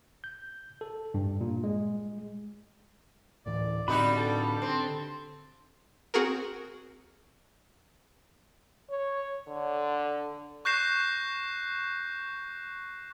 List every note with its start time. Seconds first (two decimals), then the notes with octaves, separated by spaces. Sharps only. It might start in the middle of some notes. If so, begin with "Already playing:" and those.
0.24 G6
0.81 A4
1.14 G2
1.41 A#2
1.64 G#3
3.46 D2 A2 E3 D5
3.88 A2 D3 G3 C4 D#4 F#4 B5
4.17 A4
4.62 C4
6.14 C4 F#4 G#4 A#4
8.90 C#5
9.48 D3
10.65 C#6 F#6 G6 A#6 C7 E7